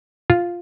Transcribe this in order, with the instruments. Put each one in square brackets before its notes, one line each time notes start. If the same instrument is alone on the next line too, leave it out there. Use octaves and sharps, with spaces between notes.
[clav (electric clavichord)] F4